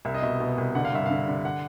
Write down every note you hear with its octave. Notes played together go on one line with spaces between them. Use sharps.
C2 E5
D#5
B2 E5
B2
C2
D3 F#5
F5
G2 E5
D3 F5
D3
F#5